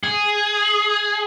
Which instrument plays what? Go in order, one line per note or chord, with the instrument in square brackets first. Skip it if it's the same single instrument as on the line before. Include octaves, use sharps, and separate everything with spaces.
[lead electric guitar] G#4